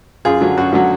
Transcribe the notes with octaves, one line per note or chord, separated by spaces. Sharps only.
F#2 F4 G#4
D3 F#3
F#2 F#4
D3 F#3